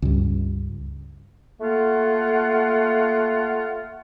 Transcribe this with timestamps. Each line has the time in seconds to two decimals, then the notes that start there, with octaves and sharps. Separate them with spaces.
0.02 C#2 G2
1.61 A3 A#3 F4 F#5